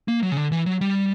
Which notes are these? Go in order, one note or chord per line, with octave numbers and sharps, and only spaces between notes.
A#3
F#3
C#3
D3
E3
F#3
G3